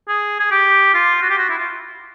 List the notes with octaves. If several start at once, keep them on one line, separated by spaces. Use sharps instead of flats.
G#4
G#4
G4
F4
F#4
G4
F#4
E4
F4